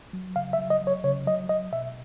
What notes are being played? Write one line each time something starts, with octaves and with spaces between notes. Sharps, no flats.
F#3
C#3 F5
E5
F#3
D#5
F#3
C#5
C#3 C#5
F#3 D#5
F#3 D#5
B2 E5